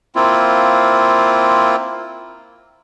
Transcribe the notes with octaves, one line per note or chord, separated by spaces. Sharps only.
A#3 C4 E4 F4